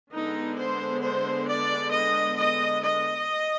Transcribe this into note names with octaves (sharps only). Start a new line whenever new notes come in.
D3 G#3 B3 D#4
C5
C5
D5
D#5
D#5
D#5